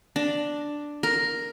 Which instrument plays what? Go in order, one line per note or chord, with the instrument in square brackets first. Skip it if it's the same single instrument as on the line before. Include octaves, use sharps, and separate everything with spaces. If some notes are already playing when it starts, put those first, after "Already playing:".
[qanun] D4
A#4